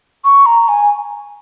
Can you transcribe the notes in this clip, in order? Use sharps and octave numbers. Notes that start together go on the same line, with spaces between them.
C#6
A#5
G#5